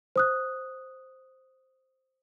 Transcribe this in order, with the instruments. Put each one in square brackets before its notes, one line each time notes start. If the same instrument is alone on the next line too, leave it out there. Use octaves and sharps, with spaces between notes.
[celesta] C5 D#6 F#6